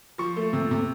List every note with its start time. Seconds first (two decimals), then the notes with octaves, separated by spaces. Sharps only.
0.18 F3 C#6
0.36 A3
0.53 C3
0.71 C3